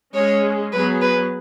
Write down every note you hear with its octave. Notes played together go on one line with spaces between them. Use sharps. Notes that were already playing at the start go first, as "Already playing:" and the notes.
G#3 C#4 G#4 C#5
F#3 B3 G#4 B4
B4